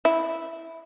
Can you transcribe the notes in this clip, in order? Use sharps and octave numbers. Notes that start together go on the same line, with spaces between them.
E4